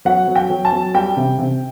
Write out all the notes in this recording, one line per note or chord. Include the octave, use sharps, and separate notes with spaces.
F#3 F#5
F#3
G5
F#3
A5
F#3
G3 G5
C3
C3